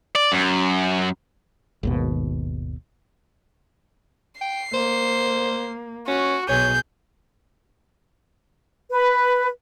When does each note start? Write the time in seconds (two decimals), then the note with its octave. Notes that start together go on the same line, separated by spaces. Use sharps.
0.15 D5
0.32 F#2
1.83 G#1 D#2 B2
4.41 G5 C7
4.74 A#3 C5
6.07 C#4 F#4
6.49 B1 G#4 C#5 G6
8.90 B4